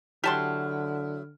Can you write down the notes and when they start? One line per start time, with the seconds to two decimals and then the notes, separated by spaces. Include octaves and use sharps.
0.24 D3 F#3 E4 G4 A5 C6 F6